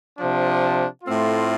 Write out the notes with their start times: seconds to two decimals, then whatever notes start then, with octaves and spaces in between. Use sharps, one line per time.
0.19 C3 F3 D4
1.04 A2 A3 C4 F4